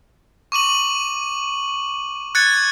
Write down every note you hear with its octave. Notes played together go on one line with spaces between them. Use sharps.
C#6 D6 D#7 F#7
F#6 G#6 A6 C#7